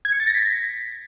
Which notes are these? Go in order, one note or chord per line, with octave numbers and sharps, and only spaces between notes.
G#6
C#7
A6
A#6
B6